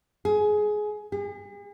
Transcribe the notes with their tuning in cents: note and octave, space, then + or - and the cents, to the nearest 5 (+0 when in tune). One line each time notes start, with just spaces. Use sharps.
G#4 +20
G#4 -40